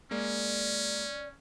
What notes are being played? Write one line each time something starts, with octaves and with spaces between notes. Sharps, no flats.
G#3 A#3 C#4 D5